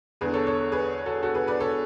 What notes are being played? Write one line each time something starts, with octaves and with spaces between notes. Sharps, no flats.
E2 D3 G#4 B4
A4 C#5
A4 C#5
G#4 B4
F#4 A4
F#4 A4
G#4 B4
B4 D5
A4 C#5